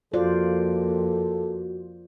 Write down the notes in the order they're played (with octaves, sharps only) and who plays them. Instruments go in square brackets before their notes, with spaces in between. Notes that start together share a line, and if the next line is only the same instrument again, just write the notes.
[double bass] F2 A#3 [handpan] F4 C5 D5 [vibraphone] F#4 [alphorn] A4